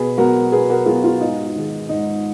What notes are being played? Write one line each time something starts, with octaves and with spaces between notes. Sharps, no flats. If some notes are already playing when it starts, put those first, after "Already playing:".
Already playing: B2 G#4 B4
F#3 B3 F#4 A#4
B2 G#4 B4
F#4 A#4
F#3 B3 F4 G#4
F4
G#2 D#4
D#3 G#3
G#2 D#4